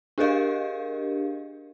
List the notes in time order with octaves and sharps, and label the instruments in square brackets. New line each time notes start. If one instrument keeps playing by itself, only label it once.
[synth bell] D4 G4 G#4 A#4 D#5 F5